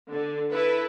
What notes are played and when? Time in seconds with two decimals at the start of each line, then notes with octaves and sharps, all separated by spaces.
0.12 D3
0.52 E4 A4 B4